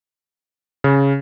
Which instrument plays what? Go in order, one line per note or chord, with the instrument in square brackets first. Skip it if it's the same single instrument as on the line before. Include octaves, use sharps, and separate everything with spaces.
[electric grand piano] C#3